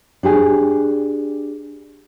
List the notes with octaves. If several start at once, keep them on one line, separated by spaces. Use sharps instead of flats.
D4 G4 G#4